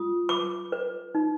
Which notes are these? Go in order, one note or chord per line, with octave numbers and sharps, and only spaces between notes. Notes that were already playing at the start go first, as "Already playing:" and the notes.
Already playing: F4 D#6
B4 D6
B4
D#4